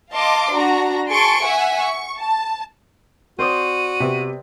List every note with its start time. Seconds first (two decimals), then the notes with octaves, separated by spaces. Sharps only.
0.11 D#5 F5 A5 C6 D6
0.53 D4 F#4 A#5
1.09 G#4 A5 C6 C#6 D7
1.44 E5 F#5 G#5
1.79 C#6
2.18 A5
3.39 C4 F#4 C5 D5 D#6 D#7
4.00 C3 B3